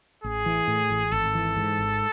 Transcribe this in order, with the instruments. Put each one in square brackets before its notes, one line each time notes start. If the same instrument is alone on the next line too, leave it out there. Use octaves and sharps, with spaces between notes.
[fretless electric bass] A1 [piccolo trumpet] G#4
[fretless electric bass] E3
A2
A1
[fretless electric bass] G#1 [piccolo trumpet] A4
[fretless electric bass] E3
G#2
G#1